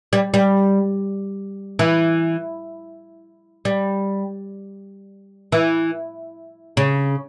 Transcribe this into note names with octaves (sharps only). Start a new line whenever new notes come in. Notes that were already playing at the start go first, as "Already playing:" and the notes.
G3
G3
E3
G3
E3
C#3